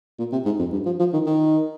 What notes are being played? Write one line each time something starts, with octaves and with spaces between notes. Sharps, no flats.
A#2
C3
G#2
F2
G2
F3
F3
D#3
D#3